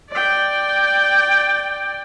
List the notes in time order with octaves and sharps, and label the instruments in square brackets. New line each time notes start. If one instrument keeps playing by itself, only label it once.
[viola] D5 G5